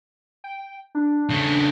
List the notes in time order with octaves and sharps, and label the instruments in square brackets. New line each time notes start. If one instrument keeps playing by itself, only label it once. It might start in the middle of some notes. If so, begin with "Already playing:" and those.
[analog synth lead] G5
D4
[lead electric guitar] C#3 A3